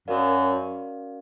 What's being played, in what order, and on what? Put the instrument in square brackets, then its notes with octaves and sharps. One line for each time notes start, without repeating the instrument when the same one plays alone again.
[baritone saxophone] F#2 [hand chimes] C#4 F#4 A#4 D5 F5